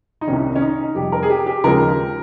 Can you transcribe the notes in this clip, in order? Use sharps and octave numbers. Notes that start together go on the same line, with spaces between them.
D#4
C2 C3 D#3 C#4
C#4
D#4
F2 C3 G3 G4
A#4
G#4
G4
G4
D#2 C#3 F3 G#3 A#4